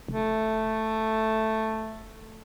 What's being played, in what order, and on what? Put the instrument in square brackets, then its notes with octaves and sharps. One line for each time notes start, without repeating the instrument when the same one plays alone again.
[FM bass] F1 [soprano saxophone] A3